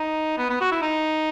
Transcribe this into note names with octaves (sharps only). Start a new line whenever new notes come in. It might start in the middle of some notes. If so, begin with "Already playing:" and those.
Already playing: D#4
B3
B3
F#4
E4
D#4